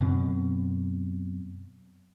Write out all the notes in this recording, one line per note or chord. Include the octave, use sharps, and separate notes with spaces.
F#2 B2 C4